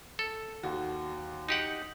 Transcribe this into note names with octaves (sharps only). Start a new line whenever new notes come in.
A4
D#2 F#4
D#4 G4 F#5